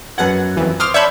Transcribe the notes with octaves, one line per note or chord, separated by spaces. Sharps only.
F#2 B4 F#5 G#6
F2 E3
C5 C6 D6 D#6 F6
C#5 D5 E5 A5 B5 C6 G6